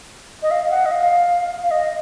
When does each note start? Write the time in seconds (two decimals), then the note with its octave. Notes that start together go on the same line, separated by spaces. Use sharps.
0.43 D#5
0.51 F5
0.71 F#5
0.86 D#5
0.91 F5
1.64 F5
1.71 D#5